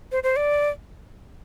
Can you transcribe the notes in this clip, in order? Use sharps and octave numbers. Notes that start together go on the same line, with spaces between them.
C5
C5
D5